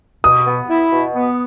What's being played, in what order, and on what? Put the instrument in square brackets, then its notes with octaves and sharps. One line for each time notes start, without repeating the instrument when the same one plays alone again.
[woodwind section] B2 [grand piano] D#6
[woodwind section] B3
E4
B2
B3